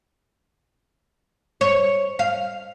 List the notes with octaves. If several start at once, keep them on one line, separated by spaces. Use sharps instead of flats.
C#5
F5